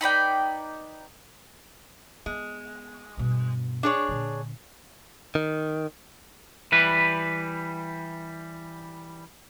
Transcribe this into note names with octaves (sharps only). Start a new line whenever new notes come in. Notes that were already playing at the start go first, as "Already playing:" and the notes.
D#4 B4 D5 G5
G#3 B3
G2 B2
D4 G#4 C#5
A#2 D3
D#3
E3 G3 B4